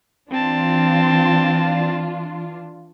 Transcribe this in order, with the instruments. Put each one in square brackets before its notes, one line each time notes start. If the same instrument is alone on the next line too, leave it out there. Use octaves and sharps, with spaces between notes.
[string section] E3 D4 F4 [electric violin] C4 A5